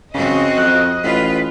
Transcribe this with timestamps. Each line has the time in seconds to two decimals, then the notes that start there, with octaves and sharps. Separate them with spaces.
0.14 C#3 C4 F#4 D#5
0.57 F2 F#6
1.03 A1 F4 B4